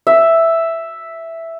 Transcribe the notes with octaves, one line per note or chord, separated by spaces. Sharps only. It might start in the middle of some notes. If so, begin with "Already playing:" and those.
E5